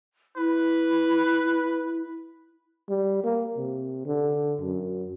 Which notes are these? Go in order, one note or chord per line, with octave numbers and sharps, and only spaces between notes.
E4 B4
G3
A#3
C3
D3
F#2